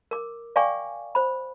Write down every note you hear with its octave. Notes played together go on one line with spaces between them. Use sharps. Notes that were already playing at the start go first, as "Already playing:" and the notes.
A#4 D6
D5 F5 G5 G#5 C#6 D6
C5 B5